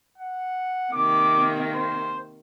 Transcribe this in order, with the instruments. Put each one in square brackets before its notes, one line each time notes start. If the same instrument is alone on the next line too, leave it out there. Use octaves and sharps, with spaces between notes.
[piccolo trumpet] F#5
[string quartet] C3 D#3 A#3 [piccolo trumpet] D6
[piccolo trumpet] C5